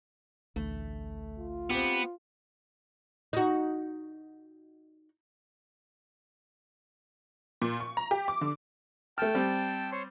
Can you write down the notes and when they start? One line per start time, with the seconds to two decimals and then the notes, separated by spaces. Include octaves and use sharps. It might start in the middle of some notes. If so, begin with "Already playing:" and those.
0.56 A1 D2 A3
1.38 F4
1.70 B3 C4 G4
3.33 D#4 F#4
7.62 A#2
7.80 C#6
7.97 A#5
8.11 G4
8.28 D6
8.41 D3
9.18 A3 G5 A5 F6
9.35 G3 C4
9.92 C5 C#5 C6